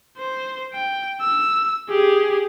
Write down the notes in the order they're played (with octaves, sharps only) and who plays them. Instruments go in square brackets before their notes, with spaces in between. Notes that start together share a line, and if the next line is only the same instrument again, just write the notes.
[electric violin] C5
G5
E6
G4 G#4